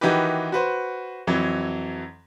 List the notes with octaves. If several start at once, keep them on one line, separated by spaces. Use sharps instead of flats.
D#3 E3 D#4 F#4 G4 B4
F#4 B4 C5
F2 E3 F#3